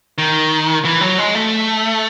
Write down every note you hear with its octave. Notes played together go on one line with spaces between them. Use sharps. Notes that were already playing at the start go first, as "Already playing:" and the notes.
D#3
E3
F#3
G#3
A3